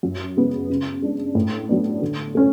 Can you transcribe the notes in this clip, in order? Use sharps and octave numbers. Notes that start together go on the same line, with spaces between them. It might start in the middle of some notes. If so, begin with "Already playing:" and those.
F#2
C#3 G#3 B3
C#3
G#3 D4
A2
F#3 B3 D4
D3
A3 C#4